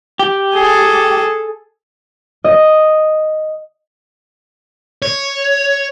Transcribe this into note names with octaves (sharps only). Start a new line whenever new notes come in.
G4
G#4 A4
D#5
C#5